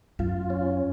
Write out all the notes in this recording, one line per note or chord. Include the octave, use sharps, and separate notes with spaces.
F#2 F4
C#4